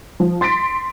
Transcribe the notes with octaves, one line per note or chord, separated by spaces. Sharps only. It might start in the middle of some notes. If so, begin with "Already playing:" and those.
F3
C6 A6 B6 D7